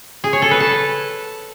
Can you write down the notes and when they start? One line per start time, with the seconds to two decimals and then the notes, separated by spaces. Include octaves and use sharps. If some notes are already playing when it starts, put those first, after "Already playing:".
0.24 G#4
0.33 C#5
0.42 A4
0.51 B4
0.60 A5